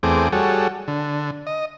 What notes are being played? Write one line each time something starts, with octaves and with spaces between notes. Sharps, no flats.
E2 A3 C4 G#4 D6
G3 F#4 G#4 A4 C#5
D3
D#5